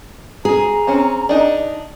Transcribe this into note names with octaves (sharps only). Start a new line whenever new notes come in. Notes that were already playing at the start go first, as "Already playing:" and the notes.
G#4 A#5
C4 C#4
D4 D#4